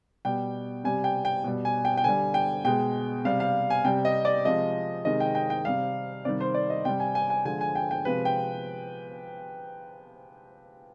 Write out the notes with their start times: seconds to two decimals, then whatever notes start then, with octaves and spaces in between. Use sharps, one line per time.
0.25 B2 G3 G5
0.84 C3 G3 G#5
1.04 G5
1.25 G5
1.44 B2 G3
1.65 G#5
1.85 G5
1.97 G5
2.04 D3 G3 G#5
2.34 G5
2.65 B2 G#3 G5
3.25 C3 G3 F5
3.40 F5
3.70 G#5
3.84 C3 G3 G5
4.05 D#5
4.25 D5
4.45 C3 F3 G#3 D#5
5.05 C3 D#3 G#3 D#5
5.20 G5
5.35 G5
5.50 G5
5.65 C3 G3 F5
6.25 C3 D#3 G3 D5
6.41 C5
6.55 D5
6.70 D#5
6.85 C3 G3 G5
7.00 G#5
7.15 G#5
7.30 G#5
7.45 D3 F3 G#3 G#5
7.61 G#5
7.75 G5
7.91 G5
8.05 C3 F3 G#3 B4
8.25 G5